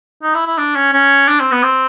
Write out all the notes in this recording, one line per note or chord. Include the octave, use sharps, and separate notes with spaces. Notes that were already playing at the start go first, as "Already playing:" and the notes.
D#4
E4
E4
D4
C#4
C#4
D4
C4
B3
C4